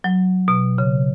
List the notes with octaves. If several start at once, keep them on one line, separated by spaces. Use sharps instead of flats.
F#3
B2
C#3